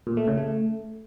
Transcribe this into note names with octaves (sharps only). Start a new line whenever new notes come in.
A#2
A3
C#3
A3